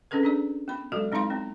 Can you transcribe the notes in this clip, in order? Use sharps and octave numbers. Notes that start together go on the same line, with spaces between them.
C4 C#4 G#4 A4 B4
D4 G#4 D5
B3 B5
F#3 G#3 F#4 A4
G#3 C4 D#4 E4 F5 C6
B3 C4